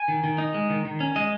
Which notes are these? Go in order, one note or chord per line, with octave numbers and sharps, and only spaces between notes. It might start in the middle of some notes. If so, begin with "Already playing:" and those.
Already playing: G#5
D#3
D#3
D#4
G#3
D#3
D#3
C#4
G#3 D#5